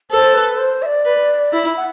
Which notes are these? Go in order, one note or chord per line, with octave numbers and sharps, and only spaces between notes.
A4 C5
B4
C5
E5
D5
B4
E4
F#5